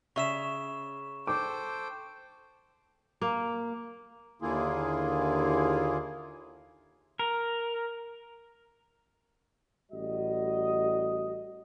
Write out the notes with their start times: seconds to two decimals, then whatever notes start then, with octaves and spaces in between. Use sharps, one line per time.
0.16 C#3 E5 C#6 E7
1.27 A4 C5 G5 D6
3.22 A#3
4.42 D#2 D3 A#3 E4 F4 G#4
7.19 A#4
9.91 A1 G3 F#4 D#5